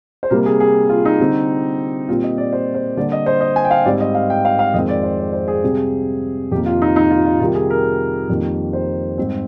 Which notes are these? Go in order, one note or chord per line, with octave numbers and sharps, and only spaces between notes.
C5
C3 G3 A#3 A#4
G#4
G#4
F4
D#4
D3 G3 C4
A#2 G3 C4 F4
D#5
D5
C5
C5
D3 G3 A#3 D5
D#5
C5
D#5
G#5
G5
F5
G#2 G3 C4 D5
D#5
F5
G5
F5
F5
F2 D#3 G#3 C4 D#5
D5
C5
D5
C5
G#4
C3 G3 C4
F2 C3 D#3 A#3 G4
F4
D#4
D#4
F4
F4
C3 D#3 G3 F4
G#4
A#4
F2 D#3 G3 A#3
C5
G#2 G3 C4